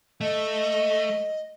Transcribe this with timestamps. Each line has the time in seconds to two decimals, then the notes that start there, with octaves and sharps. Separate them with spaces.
0.21 A3 D#5